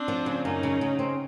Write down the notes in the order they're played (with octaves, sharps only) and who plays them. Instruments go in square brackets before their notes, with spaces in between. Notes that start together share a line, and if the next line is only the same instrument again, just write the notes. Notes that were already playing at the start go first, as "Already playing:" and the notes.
Already playing: [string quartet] C4 D4
[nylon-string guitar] F3
C#3
[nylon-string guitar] F#2 [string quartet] C#4 D#4
[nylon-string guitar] C#3
C#3
C4